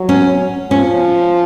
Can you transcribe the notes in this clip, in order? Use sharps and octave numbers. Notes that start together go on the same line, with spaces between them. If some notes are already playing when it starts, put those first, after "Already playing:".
Already playing: F#3
C#4
F3 C#4